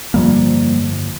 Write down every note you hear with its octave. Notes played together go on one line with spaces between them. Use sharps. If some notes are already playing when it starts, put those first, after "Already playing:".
G1 F2 F3 G3 A#3